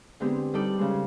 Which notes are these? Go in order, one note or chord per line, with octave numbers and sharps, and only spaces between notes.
D3 G#3 B3 C4 D4 G4
G3 D#4 A4 D5
C#3 G#3